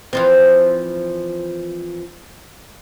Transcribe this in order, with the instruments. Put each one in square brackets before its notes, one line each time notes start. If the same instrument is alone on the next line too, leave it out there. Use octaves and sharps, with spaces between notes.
[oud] E3 F3 C4